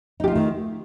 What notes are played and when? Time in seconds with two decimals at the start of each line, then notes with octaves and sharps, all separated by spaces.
0.20 D#4
0.24 G4
0.28 F4
0.32 A3
0.35 D#3